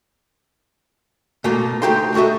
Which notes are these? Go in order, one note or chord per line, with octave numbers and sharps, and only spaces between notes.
B2 A3 A#3 F4
D2 D3 D#4 G4 A4 C6
A3 F#4 A4 D#5 E5